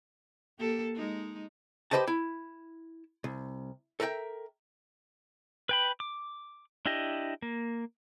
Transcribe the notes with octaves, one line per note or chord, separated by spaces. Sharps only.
A#3 G4 A4
G#3 D#4
G4 A4 B4 C5 D#5 A5
E4
C2
A4 A#4 E5 F#5 G5
B4 G5 B5
D6
D4 E4 G4 D#5
A#3